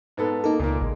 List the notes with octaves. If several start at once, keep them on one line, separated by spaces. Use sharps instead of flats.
G#2 B3 A4
A#3 D#4 A4
C#2 A#2 A#3
A1 G#3